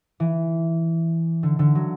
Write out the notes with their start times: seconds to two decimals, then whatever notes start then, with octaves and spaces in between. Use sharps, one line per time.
0.20 E3
1.43 D3
1.59 D3
1.75 F#3